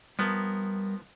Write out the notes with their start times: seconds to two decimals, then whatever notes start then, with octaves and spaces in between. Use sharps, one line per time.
0.19 F3 G3 B3 A#4